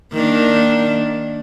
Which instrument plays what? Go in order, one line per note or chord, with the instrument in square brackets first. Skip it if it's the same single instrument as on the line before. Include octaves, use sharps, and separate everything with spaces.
[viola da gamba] D#3 A#3 D4